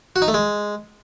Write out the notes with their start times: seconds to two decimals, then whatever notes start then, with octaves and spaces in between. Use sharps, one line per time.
0.16 F#4
0.22 D#4
0.28 A3
0.34 G#3